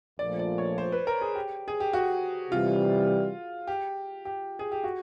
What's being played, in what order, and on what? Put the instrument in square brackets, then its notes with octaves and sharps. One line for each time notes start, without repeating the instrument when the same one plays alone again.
[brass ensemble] A#1 A#2 F3 A3 [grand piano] D5
[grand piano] D5
C#5
C5
B4
A#4
G#4
G4
G#4
G4
F#4
[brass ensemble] C3 E3 G3 [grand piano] F4
[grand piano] G4
G4
G#4
G4
F#4